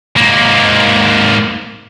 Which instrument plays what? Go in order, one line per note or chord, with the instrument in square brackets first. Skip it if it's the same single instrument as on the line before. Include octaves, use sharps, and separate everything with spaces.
[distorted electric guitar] G#2 A#3